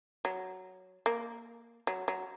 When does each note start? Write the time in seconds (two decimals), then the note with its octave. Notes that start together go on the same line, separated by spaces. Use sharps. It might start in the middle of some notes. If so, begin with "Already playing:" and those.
0.25 F#3
1.06 A#3
1.87 F#3
2.08 F#3